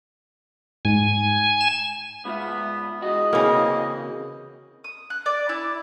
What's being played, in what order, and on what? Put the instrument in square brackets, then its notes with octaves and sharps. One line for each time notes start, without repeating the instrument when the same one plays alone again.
[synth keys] G#2 [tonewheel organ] G#5
[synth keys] E7
[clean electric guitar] G#2 F4 E5 [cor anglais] B3
[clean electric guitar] E3 G#3 F#4 [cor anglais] D#5
[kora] C#3 E3 A#3 [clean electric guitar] C4 F#4
[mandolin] D#6
F#6
D5
E4